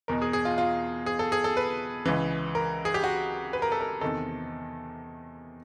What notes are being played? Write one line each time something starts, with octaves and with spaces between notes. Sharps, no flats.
E2 B2 A#4
G#4
G#4
F4
F4
G#4
A4
G#4
A4
B4
C#2 C#3 E3
A#4
G#4
G4
F#4
B4
A#4
A4
A#4
E2 C3 D#3 A4